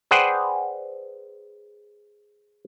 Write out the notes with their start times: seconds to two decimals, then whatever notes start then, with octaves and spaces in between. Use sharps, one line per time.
0.11 G#4 B4 C5 D5 F#5 G5